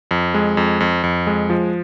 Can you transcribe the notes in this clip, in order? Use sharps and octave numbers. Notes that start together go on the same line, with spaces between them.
F2
G#3
F2
F2
F2
G#3
F3